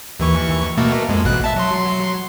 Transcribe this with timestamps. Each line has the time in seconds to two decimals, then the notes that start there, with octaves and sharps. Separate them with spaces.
0.20 D#2 E3 C#6
0.77 B2 A3 A#3
1.09 F2 G#3
1.25 A1 B2 F#6
1.44 E5 A5
1.56 F#3 C6